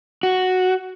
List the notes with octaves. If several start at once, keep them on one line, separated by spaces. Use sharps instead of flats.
F#4